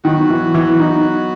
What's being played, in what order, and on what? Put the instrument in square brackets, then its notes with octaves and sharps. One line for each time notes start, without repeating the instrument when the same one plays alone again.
[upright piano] D#3 [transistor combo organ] F#3 B3 F#4
[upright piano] E3
E3
D#4